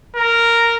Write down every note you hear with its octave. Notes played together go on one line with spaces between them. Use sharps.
A#4